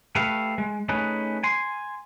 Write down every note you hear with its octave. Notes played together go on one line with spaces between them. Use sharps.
A3 G4 B4 E5 F5
G#3
A3 C#4 D#4 G#4 B4
G#5 C6